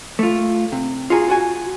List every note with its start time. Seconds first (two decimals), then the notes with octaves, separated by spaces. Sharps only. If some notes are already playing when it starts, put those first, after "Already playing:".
0.19 A3 F4
0.72 C3
1.10 F4 F#4 G#4 A#5
1.28 F4 F#4 G#5